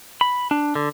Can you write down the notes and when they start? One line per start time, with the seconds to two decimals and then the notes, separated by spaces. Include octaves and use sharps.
0.21 B5
0.51 D4
0.75 D3